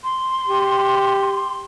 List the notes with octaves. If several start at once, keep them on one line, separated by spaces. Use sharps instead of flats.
C6
G4